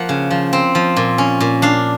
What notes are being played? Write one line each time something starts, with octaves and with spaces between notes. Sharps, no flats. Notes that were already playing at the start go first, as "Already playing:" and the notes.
Already playing: F3 A#3 F#5
C#3
F3
C4
F3
A#2
C#4
A#2
D4 F5